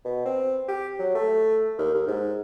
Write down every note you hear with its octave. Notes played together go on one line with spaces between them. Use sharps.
B2
C4
G4
F#3
A3
D#2
D#2
G#2